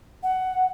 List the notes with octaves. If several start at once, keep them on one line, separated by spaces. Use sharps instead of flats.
F#5